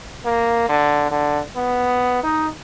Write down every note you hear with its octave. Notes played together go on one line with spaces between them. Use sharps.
A#3
D3
D3
B3
D#4